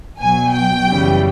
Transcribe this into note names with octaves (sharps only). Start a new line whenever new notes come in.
B2 F#3 G#5
G5
F#2 C#3 E3 G3